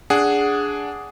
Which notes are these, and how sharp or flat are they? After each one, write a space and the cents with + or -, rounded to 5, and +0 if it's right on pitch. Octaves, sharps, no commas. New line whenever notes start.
D4 -10 G#4 +0 F#5 +0